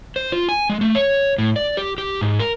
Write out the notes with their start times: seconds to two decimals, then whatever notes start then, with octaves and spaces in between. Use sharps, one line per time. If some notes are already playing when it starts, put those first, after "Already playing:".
0.16 C5
0.32 F4
0.49 G#5
0.69 G#3
0.81 A3
0.95 C#5
1.38 A2
1.56 D5
1.77 G4
1.98 G4
2.21 G#2
2.39 A#4